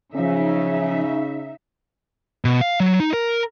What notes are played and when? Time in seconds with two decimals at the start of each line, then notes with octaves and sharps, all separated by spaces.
0.15 C#3 F3 C#4 D#4 E5
2.45 B2
2.61 F5
2.80 F#3
3.00 D#4
3.13 A#4